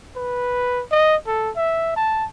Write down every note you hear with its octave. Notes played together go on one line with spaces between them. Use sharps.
B4
D#5
A4
E5
A5